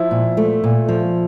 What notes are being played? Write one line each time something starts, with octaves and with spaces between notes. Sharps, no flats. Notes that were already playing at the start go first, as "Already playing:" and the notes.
Already playing: F3 E4
A#2
A3
A#2
F3